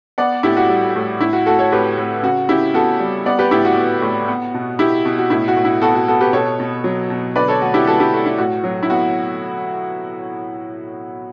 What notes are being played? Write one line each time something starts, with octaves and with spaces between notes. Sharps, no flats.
B3 D5 F#5
A2 E4 G4
F#4
G3
A2
A2 E4
F#4
A3 F#4 A4
A4 C#5
A2 G4 B4
A2
C#3 F#4
C#3 E4 G4
B3 F#4 A4
G3
B3 D5 F#5
G4 B4
A2 E4 G4
F#4
B3
A2
B3
B2
B3 E4 G4
B2
F#4
A2 E4
F#4
A2
E4
B3 F#4 A4
F#4
B3 F#4 A4
G4 B4
B2 A4 C#5
B2
F#3
B2
D3 B4 D5
A4 C#5
A3 F#4
E4 G4
A3 F#4 A4
E4 G4
A3 F#4
E4
A2 F#4
F#3
E4
B3 F#4